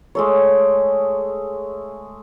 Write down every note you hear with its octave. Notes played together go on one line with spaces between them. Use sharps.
G#3 A3 C#5